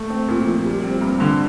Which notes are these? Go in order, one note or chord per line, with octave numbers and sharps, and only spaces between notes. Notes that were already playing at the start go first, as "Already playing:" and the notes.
Already playing: A3
C4
A#2
F3
G3
C4
G2
D3